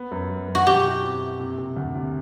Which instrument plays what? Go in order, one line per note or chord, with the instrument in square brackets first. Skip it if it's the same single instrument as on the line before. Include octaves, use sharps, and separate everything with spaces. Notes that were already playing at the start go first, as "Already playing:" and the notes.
Already playing: [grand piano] B3
F#2
F#3
F#2
[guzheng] F#4
[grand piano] B2 [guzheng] G4
[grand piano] E4
C4
E4
C3
C3
D2
C3